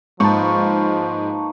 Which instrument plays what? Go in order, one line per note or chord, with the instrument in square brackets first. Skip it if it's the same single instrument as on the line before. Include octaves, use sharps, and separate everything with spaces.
[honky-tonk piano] G#2 [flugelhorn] F3 [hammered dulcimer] A#3 D#4 B4 [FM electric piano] A5 C#6